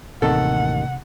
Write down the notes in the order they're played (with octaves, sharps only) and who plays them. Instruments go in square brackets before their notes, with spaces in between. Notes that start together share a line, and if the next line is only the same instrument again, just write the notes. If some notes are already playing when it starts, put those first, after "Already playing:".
[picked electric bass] A1 D#2 D#3 [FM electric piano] C3 [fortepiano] A4 [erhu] F#5